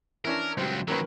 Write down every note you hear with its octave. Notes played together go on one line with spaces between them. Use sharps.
E3 C#4 D4 A#4
C#2 F#3 G3 C5
D#3 F#3 A#3 C#4 B4